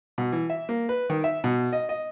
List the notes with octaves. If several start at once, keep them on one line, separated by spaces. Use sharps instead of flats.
B2
E3
E5
A#3
B4
D#3
E5
B2
D#5
D#5